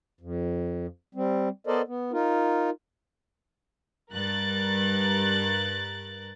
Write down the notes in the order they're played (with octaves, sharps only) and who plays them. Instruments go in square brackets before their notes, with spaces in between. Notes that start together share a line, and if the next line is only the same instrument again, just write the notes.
[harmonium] F2
G3 C4
B3 A4 A#4 C5 D5 D#5
B3
D#4 F4 A#4
[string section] G2 A#4 F#6 A6